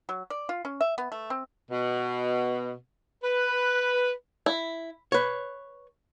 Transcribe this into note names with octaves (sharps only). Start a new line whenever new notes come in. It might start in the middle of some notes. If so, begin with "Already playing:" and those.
F#3
D5
F4
C#4
E5
B3
A3
C4
B2
B4
E4
B4 C#5